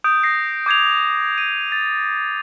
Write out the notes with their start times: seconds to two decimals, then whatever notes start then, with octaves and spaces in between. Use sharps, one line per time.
0.04 D#6 G6 D7
0.23 A#6 C7
0.66 D6 G6 G#6 C7 F7
1.38 D#7
1.72 A6